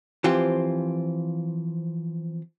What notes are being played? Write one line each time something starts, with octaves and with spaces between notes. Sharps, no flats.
E3 F3 C4 F4 G4